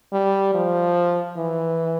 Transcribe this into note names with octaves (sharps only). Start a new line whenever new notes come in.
G3
F3
E3